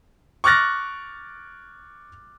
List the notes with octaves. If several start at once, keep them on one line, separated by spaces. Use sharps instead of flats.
C#6 D6 F6 F#6 A6 A#6